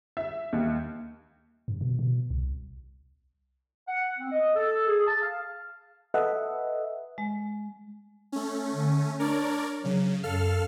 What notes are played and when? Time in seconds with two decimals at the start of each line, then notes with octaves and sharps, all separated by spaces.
0.17 E5
0.53 D#2
1.68 G2
1.81 B2
1.99 B2
2.30 C2
3.86 F#5
4.17 C4
4.31 D#5
4.53 A4
4.86 G#4
5.05 A5
5.21 F5
6.14 A4 B4 D#5 E5 F#5
7.18 G#3
8.32 A3 C#4
8.73 D3
9.19 D4 A#4 C#5 D5
9.85 C#3 F#3
10.23 F#2 A4 F5 F6